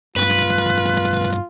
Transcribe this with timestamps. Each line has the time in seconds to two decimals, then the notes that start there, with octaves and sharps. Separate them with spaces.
0.16 B1 G2 F4 B4